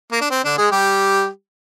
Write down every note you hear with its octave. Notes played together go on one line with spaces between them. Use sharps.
A#3
D4
C4
D3 D4
G#3 G#4
G3 G4